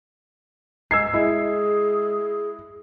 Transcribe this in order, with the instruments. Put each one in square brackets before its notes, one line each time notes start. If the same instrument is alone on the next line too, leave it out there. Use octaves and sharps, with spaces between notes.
[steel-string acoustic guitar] G#2 [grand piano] E6 G#6 C7
[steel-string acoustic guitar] G#3 [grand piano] E4 [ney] G#4